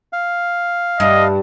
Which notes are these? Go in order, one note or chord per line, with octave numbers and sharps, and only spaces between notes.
F5
G2 D#5